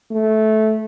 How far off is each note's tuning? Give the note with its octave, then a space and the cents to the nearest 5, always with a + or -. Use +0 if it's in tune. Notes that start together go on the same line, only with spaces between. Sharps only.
A3 -15